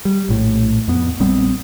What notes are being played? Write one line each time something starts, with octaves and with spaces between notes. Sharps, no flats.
G3
A#1 A2
F2 B3
A#1 G3 B3 C4